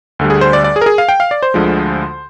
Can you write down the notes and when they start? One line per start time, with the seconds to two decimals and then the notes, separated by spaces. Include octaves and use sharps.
0.19 D2 D3 G3
0.30 G#4
0.41 C5
0.53 D5
0.64 D5
0.76 G#4
0.81 A#4
0.86 G#4
0.98 F5
1.09 G5
1.20 F5
1.31 D5
1.43 C5
1.54 D2 D3 F3 G#3